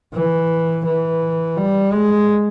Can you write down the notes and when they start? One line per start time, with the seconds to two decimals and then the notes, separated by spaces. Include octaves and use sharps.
0.14 E3
0.85 E3
1.57 G3
1.93 G#3